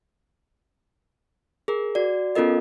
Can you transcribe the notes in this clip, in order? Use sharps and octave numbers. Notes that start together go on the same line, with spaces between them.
G#4 A#4
F#4 D5
B3 C#4 F4 A4 A#4 D#5